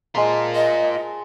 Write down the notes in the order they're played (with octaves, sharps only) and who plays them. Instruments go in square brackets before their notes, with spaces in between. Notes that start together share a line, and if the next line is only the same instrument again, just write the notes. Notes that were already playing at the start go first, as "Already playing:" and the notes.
[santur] G#3 C5 A5 [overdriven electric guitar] F4 A#4
[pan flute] D#5